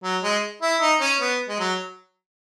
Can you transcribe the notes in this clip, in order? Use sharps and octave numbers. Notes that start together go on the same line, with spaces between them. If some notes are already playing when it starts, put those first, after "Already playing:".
F#3
G#3
E4
D#4
C#4
B3
G#3
F#3